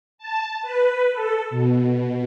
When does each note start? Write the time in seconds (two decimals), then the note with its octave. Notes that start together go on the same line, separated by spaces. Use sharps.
0.18 A5
0.62 B4
1.12 A4
1.50 B2